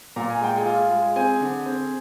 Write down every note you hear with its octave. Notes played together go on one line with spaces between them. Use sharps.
A#2 A#5
G#5
G#3 G5
G#4 G#5
F4
G#3
C4 G#4 G#5
D3
C4